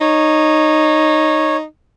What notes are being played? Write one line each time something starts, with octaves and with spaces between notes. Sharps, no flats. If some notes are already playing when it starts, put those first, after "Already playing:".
D#4 C#5